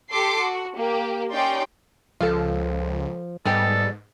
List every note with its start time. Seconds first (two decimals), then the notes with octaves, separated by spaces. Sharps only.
0.11 G4 A4 C6 D6 C7
0.42 F#4
0.76 A#3 G4
1.32 C#4 D#4 G4 D5 G5 C6
2.21 C#2 F3 F4 A4
3.45 G#2 G3 G#3 B3 G4 A4